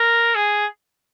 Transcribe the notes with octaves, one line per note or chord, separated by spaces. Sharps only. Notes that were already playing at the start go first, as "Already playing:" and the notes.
Already playing: A#4
G#4